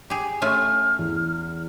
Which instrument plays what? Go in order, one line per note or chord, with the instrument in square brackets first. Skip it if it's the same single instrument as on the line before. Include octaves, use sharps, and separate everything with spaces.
[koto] G4 G#4
[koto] A3 C#4 F4 [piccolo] F6
[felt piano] E2